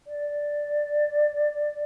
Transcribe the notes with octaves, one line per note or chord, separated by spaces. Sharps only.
D5